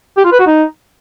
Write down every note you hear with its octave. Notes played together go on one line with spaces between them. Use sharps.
G4
F4
B4
F#4
D#4